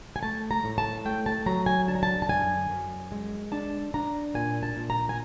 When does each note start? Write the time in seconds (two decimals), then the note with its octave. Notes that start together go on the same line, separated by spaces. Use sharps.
0.16 G#5
0.23 A3 A5
0.51 A#5
0.64 A2
0.78 A5
1.05 A3 G5
1.26 A5
1.46 F#3 A#5
1.66 G#5
1.88 D3 A5
1.95 A#5
2.03 A5
2.22 A5
2.29 F#2 G#5
2.70 F#2
3.12 G#3
3.52 D4 A5
3.94 D4 A#5
4.34 A#2 G#5
4.63 A5
4.76 A#2
4.90 A#5
5.09 G#5